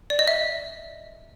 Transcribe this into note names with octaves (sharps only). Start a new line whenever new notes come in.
D5
D#5
E5